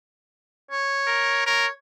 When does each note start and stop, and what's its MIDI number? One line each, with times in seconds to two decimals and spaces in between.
0.71 1.43 73
1.07 1.42 70
1.47 1.67 70
1.47 1.69 73